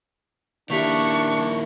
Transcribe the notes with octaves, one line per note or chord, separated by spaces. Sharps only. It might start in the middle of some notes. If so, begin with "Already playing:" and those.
D#3 A#3 D4 E4 G4 C#6 B6 F7